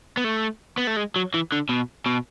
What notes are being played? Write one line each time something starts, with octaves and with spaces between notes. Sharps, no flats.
B3
A3
B3
A3
G#3
F#3
E3
D3
B2
B2